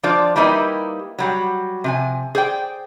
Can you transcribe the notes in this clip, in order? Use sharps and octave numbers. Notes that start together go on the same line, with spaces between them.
F3 D4 F4 C5 D5
G3 A#3 D#4 E4 G4 B4
F#3 G3 F#4
C3 F3 G#5
G#4 C5 D5 G5